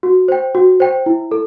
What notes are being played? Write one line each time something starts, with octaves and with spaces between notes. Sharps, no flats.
F#4
C5 G5
F#4
C5 G5
E4
A4